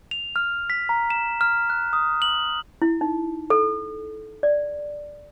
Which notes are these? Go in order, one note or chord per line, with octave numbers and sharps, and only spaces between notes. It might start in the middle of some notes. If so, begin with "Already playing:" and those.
F7
F6
B6
A#5
E7
F6
F#6
D#6
F#7
E4
D#4
A4
D5